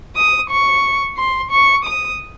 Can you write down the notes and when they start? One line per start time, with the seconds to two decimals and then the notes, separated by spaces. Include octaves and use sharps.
0.16 D#6
0.50 C#6
1.17 C6
1.51 C#6
1.85 D#6